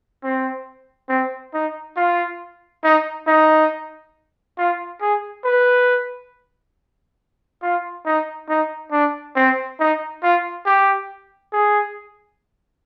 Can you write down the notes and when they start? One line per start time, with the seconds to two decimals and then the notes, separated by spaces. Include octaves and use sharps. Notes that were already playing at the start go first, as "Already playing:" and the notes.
0.23 C4
1.09 C4
1.54 D#4
1.96 F4
2.84 D#4
3.27 D#4
4.58 F4
5.01 G#4
5.44 B4
7.62 F4
8.06 D#4
8.49 D#4
8.92 D4
9.36 C4
9.80 D#4
10.23 F4
10.66 G4
11.53 G#4